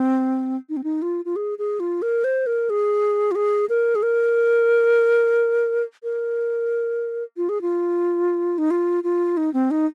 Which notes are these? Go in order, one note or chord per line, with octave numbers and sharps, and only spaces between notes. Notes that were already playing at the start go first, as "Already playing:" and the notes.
Already playing: C4
D#4
C4
D#4
F4
F4
G#4
G#4
F4
A#4
C5
A#4
G#4
F4
G#4
A#4
G#4
A#4
A#4
F4
G#4
F4
D#4
F4
F4
D#4
C4
D#4